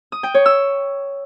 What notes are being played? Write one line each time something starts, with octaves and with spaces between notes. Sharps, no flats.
D#6
G5
C#5
E6